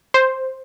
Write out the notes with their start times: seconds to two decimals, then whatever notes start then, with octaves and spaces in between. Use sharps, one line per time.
0.14 C5